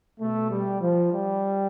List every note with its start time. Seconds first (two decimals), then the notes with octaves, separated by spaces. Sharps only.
0.21 B2 A3
0.51 G3
0.81 F3
1.13 G3